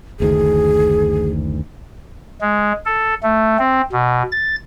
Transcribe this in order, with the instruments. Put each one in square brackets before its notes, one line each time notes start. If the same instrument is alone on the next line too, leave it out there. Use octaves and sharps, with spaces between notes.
[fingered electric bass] F#1 D2 D#3 [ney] G#4
[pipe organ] G#3
A4
A3
C4
B2
A6